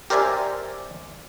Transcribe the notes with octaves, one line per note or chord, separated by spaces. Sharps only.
G4 A#4 C5 D5 E5 G#5